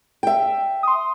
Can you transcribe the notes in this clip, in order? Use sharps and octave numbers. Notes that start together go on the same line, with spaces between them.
E5 G5
C6 D#6